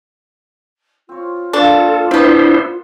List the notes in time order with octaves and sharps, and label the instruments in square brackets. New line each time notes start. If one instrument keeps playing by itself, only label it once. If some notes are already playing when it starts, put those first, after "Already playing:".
[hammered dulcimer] C4 C#5 [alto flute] F4
[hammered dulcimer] F3 A#3 [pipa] D4 [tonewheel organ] A4
[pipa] C3 B3 [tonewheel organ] D4 E4 C5